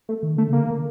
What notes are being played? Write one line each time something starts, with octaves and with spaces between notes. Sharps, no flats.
A3
D#3
D3 A3
C#3
A#3
D3
D3